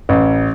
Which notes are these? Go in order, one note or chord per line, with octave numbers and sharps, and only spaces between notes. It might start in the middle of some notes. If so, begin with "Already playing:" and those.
A1